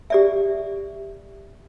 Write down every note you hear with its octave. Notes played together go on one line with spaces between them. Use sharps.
G4 D5 E5